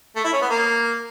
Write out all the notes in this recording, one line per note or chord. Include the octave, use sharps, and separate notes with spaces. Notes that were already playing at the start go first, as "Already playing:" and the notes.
A3
E4
C#4
B3
A#3